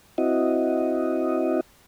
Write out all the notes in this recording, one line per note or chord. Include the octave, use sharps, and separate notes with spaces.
C4 E4 F#4 D#5